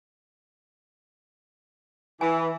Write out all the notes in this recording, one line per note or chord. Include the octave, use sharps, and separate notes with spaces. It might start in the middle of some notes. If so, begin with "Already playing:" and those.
E3 G#5